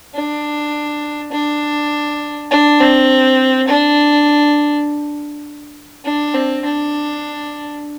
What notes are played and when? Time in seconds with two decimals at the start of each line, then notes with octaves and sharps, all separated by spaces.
0.14 D4
1.32 D4
2.51 D4
2.80 C4
3.68 D4
6.05 D4
6.35 C4
6.65 D4